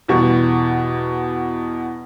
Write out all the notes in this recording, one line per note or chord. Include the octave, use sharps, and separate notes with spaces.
E2 B2 G3 C#6